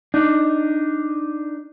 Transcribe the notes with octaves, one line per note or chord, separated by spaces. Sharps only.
D4 D#4